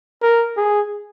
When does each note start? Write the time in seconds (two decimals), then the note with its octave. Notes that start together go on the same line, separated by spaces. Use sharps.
0.23 A#4
0.57 G#4